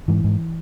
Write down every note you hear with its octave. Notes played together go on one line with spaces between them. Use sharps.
G#2 E3
G#2